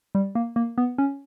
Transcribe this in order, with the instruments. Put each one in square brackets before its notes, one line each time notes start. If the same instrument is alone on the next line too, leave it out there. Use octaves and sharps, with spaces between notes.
[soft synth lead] G3
A#3
A#3
B3
C#4